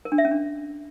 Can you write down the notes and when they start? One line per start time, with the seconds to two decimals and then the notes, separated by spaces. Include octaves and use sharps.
0.05 A#4
0.12 D4
0.18 E5
0.25 C#4
0.31 D4